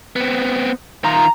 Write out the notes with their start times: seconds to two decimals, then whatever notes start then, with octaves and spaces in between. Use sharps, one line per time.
0.16 B3 C4
1.04 D#3 F4 A#5